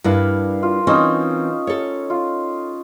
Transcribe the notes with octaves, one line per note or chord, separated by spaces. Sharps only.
G2 D4 E4 A#4 F5
F4
E3 C4 C#4 D#4 D#5
A4 C#5
F4